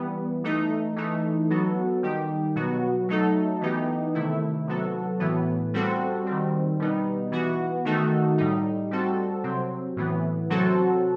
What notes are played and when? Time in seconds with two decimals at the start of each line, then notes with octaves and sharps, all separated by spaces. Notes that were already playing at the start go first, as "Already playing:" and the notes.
Already playing: E3 G3 B3
0.44 E3 A3 D#4
0.96 E3 A3 D#4
1.50 F#3 B3 F#4 A4
2.03 D#3 G3 D#4 G4
2.55 B2 F#3 B3 F#4
3.09 F#3 A3 D#4 A4
3.61 E3 B3 D#4 G4
4.15 C3 D#3 A3 E4
4.67 C3 F#3 B3 F#4 A4
5.20 A2 E3 B3
5.74 G3 C4 F#4 A4
6.27 D#3 G3 C4
6.79 B2 G3 B3 D#4
7.31 E3 B3 F#4
7.85 D#3 A3 D#4 F#4 A4
8.38 A2 G3 D#4
8.91 G3 C4 F#4 A4
9.44 C3 F#3 C4
9.96 A2 E3 B3
10.49 C3 F#3 C4 F#4 A4